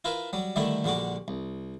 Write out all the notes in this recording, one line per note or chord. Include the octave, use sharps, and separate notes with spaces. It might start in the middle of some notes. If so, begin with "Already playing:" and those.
E4 F4 A#4 B4 E5
F#3 G3
D3 D#3 G3 A3 E4
A#1 D3 G3 F#4 D6
C2